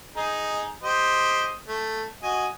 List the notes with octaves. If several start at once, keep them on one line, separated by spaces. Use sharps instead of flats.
D#4 G#4
G4 C5 D#5
A3
F#4 D#5 G#5